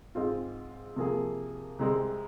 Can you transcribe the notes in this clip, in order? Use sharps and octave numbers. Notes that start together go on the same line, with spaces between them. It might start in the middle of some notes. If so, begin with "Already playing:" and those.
G#2 G#3 C4 F4
C3 F3 A#3 G#4
C2 C3 G#3 C4